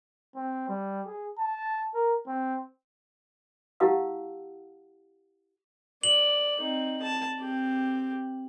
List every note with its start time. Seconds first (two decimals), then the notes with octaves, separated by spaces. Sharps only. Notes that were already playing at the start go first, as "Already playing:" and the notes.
0.35 C4
0.69 G3
1.06 G#4
1.38 A5
1.94 A#4
2.27 C4
3.80 E4 G4 F5 F#5 A5 E6
6.03 D5 F#7
6.58 C4 D#4
7.02 A5
7.39 C4 G4